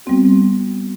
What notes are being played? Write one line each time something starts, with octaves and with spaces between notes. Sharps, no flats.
G3 B3 C4 F#4